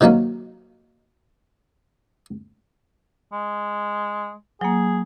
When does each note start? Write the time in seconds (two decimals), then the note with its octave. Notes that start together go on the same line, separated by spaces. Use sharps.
0.01 C3 D#3 F#3 A#3 C#4
3.32 G#3
4.61 F#3 A#3 G#4